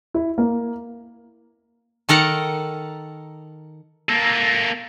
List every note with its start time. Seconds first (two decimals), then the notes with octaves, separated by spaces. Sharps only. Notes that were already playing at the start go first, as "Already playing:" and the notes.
0.14 E4
0.38 A#3
2.09 D#3 A4 A#4 F#5
4.09 A#3 A4